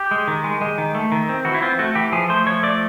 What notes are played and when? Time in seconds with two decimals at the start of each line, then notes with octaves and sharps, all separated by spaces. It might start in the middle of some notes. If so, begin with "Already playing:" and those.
Already playing: G4
0.11 G#3
0.28 D#3
0.44 G#3
0.61 G#3
0.78 D#3
0.95 A3
1.12 D#3
1.29 C4
1.45 E3 F#4
1.54 E4
1.62 C4 F4
1.79 A3 F#4
1.95 E3 G4
2.12 F3 G#4
2.30 A3 C5
2.46 F3 C#5
2.63 A3 D5